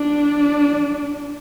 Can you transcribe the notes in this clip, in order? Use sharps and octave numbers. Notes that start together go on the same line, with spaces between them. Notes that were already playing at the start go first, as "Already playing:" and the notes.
Already playing: D4